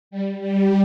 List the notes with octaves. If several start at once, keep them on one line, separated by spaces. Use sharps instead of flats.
G3
G3